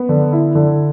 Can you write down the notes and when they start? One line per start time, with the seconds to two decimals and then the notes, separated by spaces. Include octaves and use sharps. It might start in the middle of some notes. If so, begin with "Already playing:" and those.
Already playing: B3
0.09 D3
0.32 E4
0.55 D3